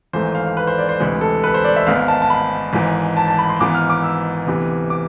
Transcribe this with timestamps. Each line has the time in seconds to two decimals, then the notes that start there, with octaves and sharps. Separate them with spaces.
0.13 G#1 G#2 E3 A3 C5
0.35 F5
0.46 F5
0.57 B4
0.67 C5
0.78 D5
0.89 C5
1.00 D2 C3 E3 G#3 B4
1.21 A4
1.44 B4
1.54 C5
1.64 D5
1.76 E5
1.87 G#1 G#2 G#3 B3 F5
2.08 A5
2.22 A5
2.30 B5
2.73 G#1 G#2 E3
3.17 A5
3.28 A5
3.39 B5
3.49 C6
3.60 G#1 G#2 E3 B3 D6
3.75 F6
3.90 D6
4.03 E6
4.47 D2 C3 E3 B3
4.90 D6